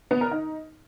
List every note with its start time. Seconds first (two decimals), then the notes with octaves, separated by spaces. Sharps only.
0.11 B3
0.21 A#4
0.31 D#4